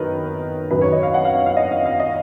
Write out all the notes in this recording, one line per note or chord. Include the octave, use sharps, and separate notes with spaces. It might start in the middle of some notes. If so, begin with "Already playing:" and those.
Already playing: F#2 D#3 A#4 B4 D#5
F#2 D#3 B4
C#5
D#5
F5
F#5
F5
F5
F5
D#5
F5
F5
D#5